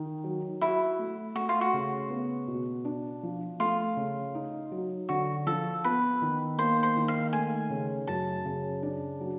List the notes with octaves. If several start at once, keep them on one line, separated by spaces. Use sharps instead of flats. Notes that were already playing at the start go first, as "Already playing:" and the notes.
Already playing: D#3 D#4
F#3
E4 F#4
A3
A3 F#4
F4
F#4
C#3
B3
B2
D4
F3
A3 F4
C#3
D#4
F#3
D3 F#4
F3 A4
B3 B4
D#3
A#3 C5
C5
D#3
F5
A3 G#5
C#3
F#2 A5
C#3
D4
F#3